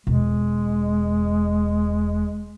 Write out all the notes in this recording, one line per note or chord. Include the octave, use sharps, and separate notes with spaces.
E1 G#3